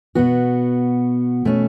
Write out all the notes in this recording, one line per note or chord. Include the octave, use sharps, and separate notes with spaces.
B2 B3 F#4
B2 A3 C#4